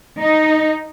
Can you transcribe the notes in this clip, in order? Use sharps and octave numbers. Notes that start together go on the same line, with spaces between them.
D#4